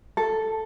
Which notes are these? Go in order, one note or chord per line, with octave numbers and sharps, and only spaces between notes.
A4